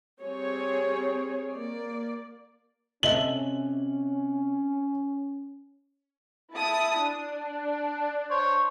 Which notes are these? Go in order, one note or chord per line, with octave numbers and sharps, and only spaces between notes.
G3 C4 G#4 C#5
A#3 D5
C3 C#4 A4 D#5 E5 F#7
E4 A5 D#6
D4
C5 C#5